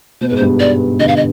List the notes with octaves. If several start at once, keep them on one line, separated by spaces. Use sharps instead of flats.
B2 C5
G#2 B4
C5
G2 B2
D5
B2 D3 D#5
F5
D#5